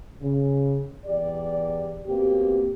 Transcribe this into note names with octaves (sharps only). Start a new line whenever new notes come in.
C#3
E2 G4 D5
B2 A#3 C4 G4